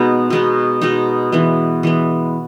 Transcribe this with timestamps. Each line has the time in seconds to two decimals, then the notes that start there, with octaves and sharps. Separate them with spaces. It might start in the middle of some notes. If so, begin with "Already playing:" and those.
Already playing: B2 G#3 B3 D#4
0.30 B2 G#3 B3 D#4
0.81 B2 G#3 B3 D#4
1.32 E3 G#3 B3
1.83 E3 G#3 B3